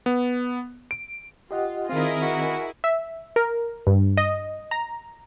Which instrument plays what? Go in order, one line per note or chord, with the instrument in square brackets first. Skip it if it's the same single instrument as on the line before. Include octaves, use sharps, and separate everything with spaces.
[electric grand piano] B3
D7
[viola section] F4 [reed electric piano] G4 D#5 F#5
[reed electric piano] D#3 C4 [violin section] E4 G#4 [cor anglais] F4 [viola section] A#4 D#5
[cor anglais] F#4
[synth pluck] E5
A#4
G2
D#5
A#5